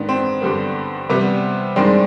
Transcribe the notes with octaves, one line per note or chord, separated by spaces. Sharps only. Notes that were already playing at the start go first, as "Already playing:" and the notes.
Already playing: G#2 D#3 B3 D4
C4
G2 D3 G3 B3
C3 G3 B3
G2 D#3 G#3 C4 D4